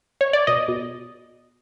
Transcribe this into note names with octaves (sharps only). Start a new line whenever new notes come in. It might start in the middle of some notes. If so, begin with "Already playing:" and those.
C#5
D5
B2 D#5
B2